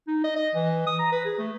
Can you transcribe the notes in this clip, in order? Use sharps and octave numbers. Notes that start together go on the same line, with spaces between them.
D#4
D#5
D#5
E3
D#6
A#5
B4
G#4
A3